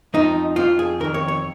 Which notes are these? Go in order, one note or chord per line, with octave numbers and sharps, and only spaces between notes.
F2 F3 D#4
F2 F3 F4
G#4
F2 D#3 A#4
C#5
C#5